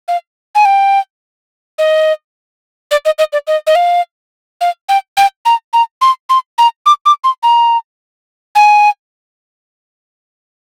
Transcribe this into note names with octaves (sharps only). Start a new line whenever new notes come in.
F5
G#5
G5
D#5
D5
D#5
D#5
D5
D#5
D#5
F5
F5
G5
G5
A#5
A#5
C6
C6
A#5
D6
D6
C6
A#5
G#5